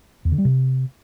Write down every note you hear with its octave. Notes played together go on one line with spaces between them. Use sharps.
E2
D3
G3
C3